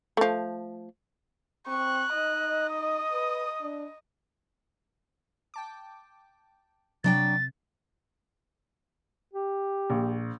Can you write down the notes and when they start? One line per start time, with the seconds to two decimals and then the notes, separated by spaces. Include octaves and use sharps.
0.17 F3 A3
1.67 C4 C#6 F#6
2.14 D#4 D#5
2.70 D#6
3.12 B4
3.62 D4
5.54 G5 A5 D6
7.04 C3 F#3 D4 G5 A6
9.33 G4
9.90 A#1